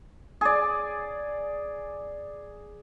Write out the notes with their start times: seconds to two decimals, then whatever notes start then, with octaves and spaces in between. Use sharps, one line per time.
0.41 G#4 D5